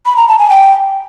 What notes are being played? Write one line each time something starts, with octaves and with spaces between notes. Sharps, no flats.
B5
A#5
A5
G#5
G5